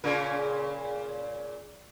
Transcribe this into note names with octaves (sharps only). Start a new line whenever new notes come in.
A#2 C#3 A#4